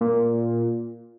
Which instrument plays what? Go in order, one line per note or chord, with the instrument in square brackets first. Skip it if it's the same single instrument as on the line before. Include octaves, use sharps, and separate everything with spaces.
[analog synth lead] A#2